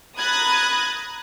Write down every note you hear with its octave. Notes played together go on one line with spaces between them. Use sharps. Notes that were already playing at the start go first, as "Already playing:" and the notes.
A#5 B5 D#6 F#6 G#6 A6